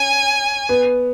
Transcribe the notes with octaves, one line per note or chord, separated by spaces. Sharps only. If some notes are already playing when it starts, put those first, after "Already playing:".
Already playing: C#4 G#5
B3